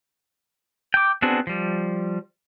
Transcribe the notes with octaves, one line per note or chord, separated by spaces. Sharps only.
G5 D6
B3 C4 D4 F#4 G#4
F3 G3